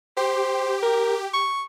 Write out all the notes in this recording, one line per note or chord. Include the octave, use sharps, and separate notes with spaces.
G4 C5
A#4
C#6